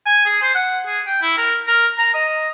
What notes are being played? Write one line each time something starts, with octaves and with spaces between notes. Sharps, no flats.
G#5
G#4
C5
F#5
G#4
G5
E4
A#4
A#4
A#5
D#5